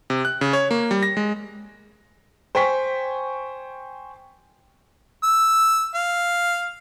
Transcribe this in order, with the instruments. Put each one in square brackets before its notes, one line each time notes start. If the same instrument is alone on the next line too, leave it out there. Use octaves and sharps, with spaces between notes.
[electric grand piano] C3
F#6
C#3
C#5
A#3
G3
A#6
G#3
[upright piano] C5 G5 G#5 C#6 B6
[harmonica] E6
F5